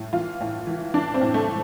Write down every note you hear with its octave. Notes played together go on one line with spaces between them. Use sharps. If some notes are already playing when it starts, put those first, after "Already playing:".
Already playing: A2
E3 F4
A2
E3
E3 D4
C4
A2
A3
A2